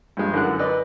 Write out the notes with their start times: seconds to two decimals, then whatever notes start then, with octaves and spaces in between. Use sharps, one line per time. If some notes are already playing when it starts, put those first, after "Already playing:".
0.17 G2 F3 G#3
0.33 F#2 D3 E3 A#4 F#5 F#6
0.59 B4 D5 D#5